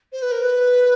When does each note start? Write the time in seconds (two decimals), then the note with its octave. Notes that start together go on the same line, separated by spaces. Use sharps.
0.12 C5
0.22 B4
0.31 A#4
0.42 B4